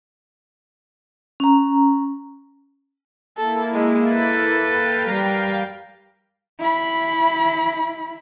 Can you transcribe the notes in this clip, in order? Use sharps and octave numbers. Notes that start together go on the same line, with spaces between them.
C#4 A#5
A#3 E4 A4
G#3
A4 B4
F5 G5
G3 A#4
E4 B5